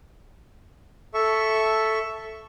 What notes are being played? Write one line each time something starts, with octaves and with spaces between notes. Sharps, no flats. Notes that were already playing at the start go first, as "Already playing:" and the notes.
A4 E5 C#6